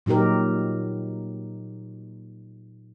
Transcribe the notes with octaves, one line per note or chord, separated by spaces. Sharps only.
A#2 F#3 D#4 G4 A#4